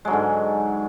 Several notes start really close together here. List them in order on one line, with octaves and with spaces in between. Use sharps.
G#3 F#3 D3 G#2